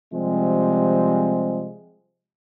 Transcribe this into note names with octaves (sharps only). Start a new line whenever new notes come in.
C3 F3 G3 G#3 C4